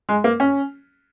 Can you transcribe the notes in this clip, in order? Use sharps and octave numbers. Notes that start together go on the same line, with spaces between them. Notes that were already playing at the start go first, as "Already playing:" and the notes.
G#3
A#3
C#4